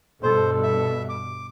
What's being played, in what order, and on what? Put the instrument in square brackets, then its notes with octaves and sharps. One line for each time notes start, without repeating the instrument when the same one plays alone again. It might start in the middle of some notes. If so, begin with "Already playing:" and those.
[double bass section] G2 B2 [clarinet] A4 [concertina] C5
[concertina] E5
D6